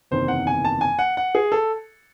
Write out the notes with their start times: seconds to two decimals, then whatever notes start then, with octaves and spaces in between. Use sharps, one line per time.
0.11 F#1 E2 C3 D#3 C5
0.28 F#5
0.47 G#5
0.65 A5
0.81 G#5
0.99 F#5
1.17 F#5
1.35 G#4
1.52 A4